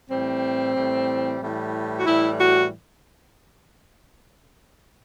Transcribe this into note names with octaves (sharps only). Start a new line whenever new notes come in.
A2 E3 G3 C4
A2 E3 G3
A2 E3 G3
F#4
A2 E3 G3 E4
F#4